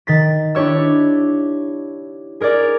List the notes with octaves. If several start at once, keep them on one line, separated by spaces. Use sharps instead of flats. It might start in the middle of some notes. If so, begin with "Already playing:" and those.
D#3 A6 B6
D4 E4 G4 C#5 E6
G#4 A#4 C#5 D5